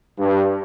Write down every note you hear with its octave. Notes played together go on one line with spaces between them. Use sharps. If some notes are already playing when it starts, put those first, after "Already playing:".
G2